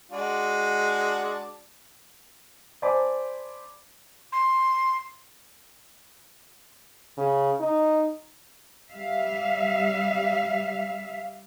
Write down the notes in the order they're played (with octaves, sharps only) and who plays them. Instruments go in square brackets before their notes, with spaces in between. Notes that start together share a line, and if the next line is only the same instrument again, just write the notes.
[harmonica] G#3 D4 F#4
[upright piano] C5 D5 G#5 A5 B5 D6
[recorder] C6
[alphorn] C#3
D#4
[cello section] G3 E5 F5